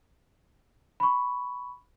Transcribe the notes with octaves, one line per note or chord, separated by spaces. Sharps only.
B5 C#6